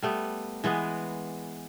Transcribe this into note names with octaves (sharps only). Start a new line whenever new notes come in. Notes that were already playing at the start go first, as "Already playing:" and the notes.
G3 A3 B3
E3 G#3 B3